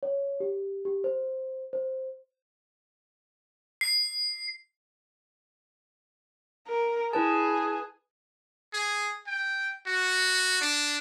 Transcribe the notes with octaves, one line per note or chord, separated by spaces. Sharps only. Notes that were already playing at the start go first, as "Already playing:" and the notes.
C#5
G4
G4
C5
C5
C7
A#4
E4 G#4 B4 A5
G#4
G5
F#4
D4